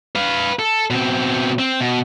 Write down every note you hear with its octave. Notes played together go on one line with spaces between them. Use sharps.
B4 F5
A4
B2 C4
C4
B2